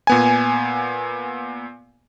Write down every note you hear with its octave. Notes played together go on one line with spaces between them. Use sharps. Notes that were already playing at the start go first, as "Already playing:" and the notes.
A#2 B3 G#5